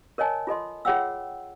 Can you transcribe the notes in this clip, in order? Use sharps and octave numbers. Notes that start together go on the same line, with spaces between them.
A#4 C#5 D#5 G#5 A5
F4 A4 D#5 C6
F4 G#4 C#5 F#5 G5 E6